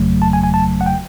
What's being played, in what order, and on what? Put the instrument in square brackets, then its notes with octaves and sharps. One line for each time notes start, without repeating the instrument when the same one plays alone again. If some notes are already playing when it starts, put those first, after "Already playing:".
Already playing: [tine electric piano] G1 F2 C#3 F#3 A3
A5
G#5
G#5
A5
F#5
G5